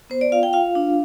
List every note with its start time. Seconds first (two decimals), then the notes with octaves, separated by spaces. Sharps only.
0.10 B3 C5
0.21 D5
0.32 F4 F5
0.43 G5
0.53 F4 F5
0.75 D4